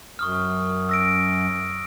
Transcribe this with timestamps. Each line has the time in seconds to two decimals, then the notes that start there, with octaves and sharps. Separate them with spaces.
0.19 F#2 C#6 D#6 F6
0.89 E6 A#6 D7